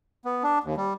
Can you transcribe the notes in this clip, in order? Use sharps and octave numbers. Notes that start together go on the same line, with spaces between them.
B3
D4
D#2
G3